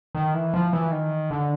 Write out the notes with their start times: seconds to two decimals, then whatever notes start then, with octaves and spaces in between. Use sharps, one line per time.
0.15 D#3
0.34 E3
0.54 F3
0.73 E3
0.91 D#3
1.30 D3